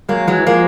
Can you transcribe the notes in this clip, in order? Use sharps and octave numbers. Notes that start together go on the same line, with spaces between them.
F#3 G#3 A#3
E3 F#3 G#3
F3 G#3 A#3